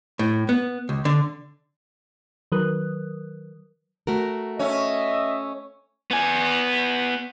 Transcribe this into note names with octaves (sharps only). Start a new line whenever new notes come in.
A2
B3
C#2
D3
D#3 F#3 A#4 B4 D#6 F#6
A3 F#4 A#4
C#4 D#5 E5
B3 G#5